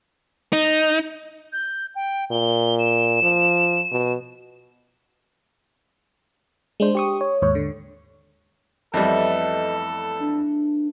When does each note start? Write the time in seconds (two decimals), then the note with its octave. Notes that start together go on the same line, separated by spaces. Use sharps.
0.53 D#4
1.53 G6
1.95 G5
2.31 A#2 G7
2.79 E7
3.22 F3
3.92 B2
6.80 G#3 D4 C5
6.95 G4 C#6 D#6
7.21 C#5
7.42 D#2 G#2 C#5
7.55 D3
8.94 F2 E3 G3 A3 B3 A4 D#5
10.20 D4